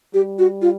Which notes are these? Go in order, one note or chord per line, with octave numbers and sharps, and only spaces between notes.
G3 G4
F#4
F4